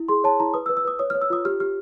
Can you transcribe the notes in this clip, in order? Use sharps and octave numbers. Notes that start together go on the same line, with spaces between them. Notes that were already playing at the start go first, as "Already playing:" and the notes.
Already playing: E4
G#4 C6
C#5 A5
E4 A#5
B4 D#6
E6
B4
E6
B4 D#6
C#5 D#6
F6
C#5
E6
F4 D#6
G4 F6
G4 F6